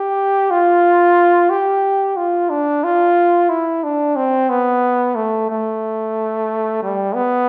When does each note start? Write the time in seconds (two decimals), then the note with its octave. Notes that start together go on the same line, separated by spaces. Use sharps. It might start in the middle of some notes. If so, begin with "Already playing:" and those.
Already playing: G4
0.51 F4
1.50 G4
2.16 F4
2.50 D4
2.84 F4
3.49 E4
3.84 D4
4.16 C4
4.49 B3
5.15 A3
5.50 A3
6.82 G3
7.15 B3